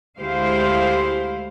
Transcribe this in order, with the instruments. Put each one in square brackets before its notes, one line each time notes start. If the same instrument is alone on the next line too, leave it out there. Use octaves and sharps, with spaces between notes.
[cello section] D2 G#3 E4 G4 C5 F5